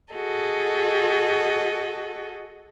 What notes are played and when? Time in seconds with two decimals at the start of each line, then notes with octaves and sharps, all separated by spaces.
0.13 F#4 G#4 A4 D#5